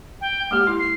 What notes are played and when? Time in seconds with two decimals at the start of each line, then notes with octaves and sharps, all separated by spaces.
0.21 G5
0.51 G#3 A#3 G4 F6
0.67 E4
0.79 C7